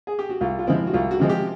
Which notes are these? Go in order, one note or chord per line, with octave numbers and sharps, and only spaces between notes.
G#4
G4
F#4
C2 F4
F4
C3 F3 G#3 C4 E4
F#4
C2 F4
F#4
C3 F3 G#3 C4
G4